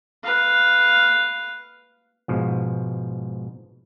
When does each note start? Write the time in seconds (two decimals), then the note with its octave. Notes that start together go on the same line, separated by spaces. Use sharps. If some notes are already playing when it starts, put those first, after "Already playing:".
0.23 B4 F5
2.28 G#2 B2 F3